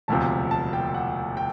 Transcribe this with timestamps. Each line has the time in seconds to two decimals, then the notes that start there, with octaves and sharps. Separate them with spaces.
0.08 E1 D2 C3 F3 A5
0.51 A5
0.73 G5
0.94 F#5
1.37 G5